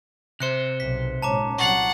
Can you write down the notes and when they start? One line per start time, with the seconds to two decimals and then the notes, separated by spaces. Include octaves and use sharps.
0.40 C3 C5 F#6 C#7
0.80 B1 B6
1.22 G#1 A#2 C#4 A5 A#5 D6
1.59 C2 F#3 F#5 C#6 A6 C7